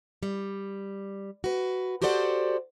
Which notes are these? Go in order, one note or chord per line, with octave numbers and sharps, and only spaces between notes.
G3
F#4 B4
F#4 G4 A4 C5 D5 F#5